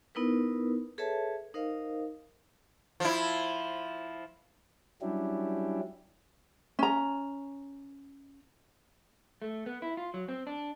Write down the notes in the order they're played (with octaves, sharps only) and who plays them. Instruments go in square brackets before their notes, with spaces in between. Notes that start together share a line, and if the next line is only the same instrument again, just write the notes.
[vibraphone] B3 D#4 E4 A#4 B4
G#4 A4 B4 C#5 E5 A5
D#4 A#4 C5 D#5 F5
[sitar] F3 E4
[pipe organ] F#3 G3 C#4 D4 E4 G4
[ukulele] C#4 A#5
[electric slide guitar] A3
B3
E4
F4
F#3
C4
D4